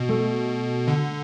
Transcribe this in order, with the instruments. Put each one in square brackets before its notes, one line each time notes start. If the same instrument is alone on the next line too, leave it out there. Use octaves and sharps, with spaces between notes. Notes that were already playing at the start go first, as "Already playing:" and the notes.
Already playing: [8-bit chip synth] B2
[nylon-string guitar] A3
[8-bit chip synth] D3